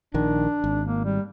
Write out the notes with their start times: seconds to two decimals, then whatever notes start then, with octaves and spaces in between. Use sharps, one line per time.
0.14 A#1 D#3 D4
0.64 G#1
0.87 A#3
1.05 G3